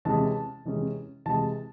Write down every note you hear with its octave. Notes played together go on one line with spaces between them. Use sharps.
C3 E3 G#3 C#4 A5
C3 E3 G#3 C#4
C3 E3 G#3 A5